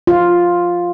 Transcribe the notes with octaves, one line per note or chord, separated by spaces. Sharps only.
F4